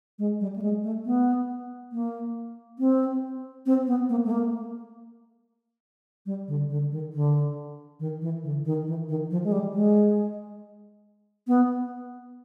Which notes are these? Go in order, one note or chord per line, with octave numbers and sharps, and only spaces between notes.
G#3
G3
A3
G#3
A3
B3
A#3
C4
C4
B3
A#3
A3
A#3
G3
D3
D3
D#3
D3
D#3
E3
D3
D#3
E3
D#3
F3
G#3
G3
G#3
B3